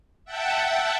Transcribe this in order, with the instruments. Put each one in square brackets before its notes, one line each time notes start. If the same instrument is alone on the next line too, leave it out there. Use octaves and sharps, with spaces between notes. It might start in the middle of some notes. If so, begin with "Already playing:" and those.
[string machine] E5 F#5 G5 A5